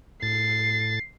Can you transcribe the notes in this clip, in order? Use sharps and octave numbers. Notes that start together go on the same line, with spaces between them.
A2 A6 C7